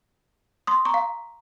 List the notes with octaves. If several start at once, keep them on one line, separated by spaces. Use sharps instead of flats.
C6 D#6
A#5 C#6
F5